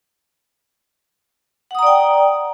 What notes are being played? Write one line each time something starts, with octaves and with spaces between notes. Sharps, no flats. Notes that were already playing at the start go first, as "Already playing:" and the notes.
D5 F#5 G5 A#5 D#6